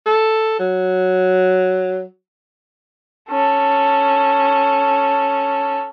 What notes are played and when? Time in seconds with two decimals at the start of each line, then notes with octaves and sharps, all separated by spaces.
0.06 A4
0.59 F#3
3.30 C#4 A4